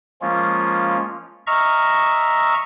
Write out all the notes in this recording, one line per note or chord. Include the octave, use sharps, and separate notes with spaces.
F3 G#3 A#3 C#4 F4
D#5 E5 A#5 C#6 E6 F6